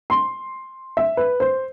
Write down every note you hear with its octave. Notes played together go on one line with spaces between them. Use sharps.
C6
E5
B4
C5